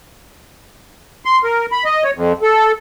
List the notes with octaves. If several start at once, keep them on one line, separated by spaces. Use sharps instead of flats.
C6
A#4
B5
D#5
C#5
F2
A4